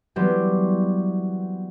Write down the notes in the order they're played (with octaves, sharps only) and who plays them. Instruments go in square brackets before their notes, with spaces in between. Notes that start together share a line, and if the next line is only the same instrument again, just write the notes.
[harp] E3 F#3 G3 B3 C4 G4